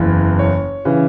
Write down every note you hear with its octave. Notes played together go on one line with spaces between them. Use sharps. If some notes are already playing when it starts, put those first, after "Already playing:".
Already playing: F#1 E2 E3
C#5
C#3 E3